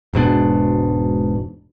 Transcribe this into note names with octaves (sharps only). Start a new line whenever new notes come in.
E1 G#2 B2 D4